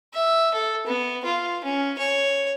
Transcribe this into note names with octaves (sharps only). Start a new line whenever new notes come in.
E5
A4
B3
F4
C#4
C#5